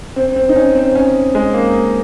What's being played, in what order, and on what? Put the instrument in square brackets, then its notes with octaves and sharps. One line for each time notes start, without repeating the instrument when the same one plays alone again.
[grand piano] C4
C4
D#4
C#4
C4
C#4
G#3
A#3